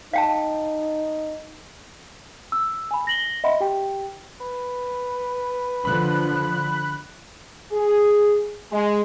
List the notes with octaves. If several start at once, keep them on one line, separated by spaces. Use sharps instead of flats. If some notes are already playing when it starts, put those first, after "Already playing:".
D#4 F5 G5 A5
E6
G#5 B5
A#6 F#7 G7
D#5 E5 F#5 B5 C6
G4 G5
B4
D3 F3 B5 F#6
G#4
G#3